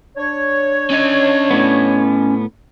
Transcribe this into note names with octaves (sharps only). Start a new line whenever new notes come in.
D4 C#5
C#4 D#5
A2 B3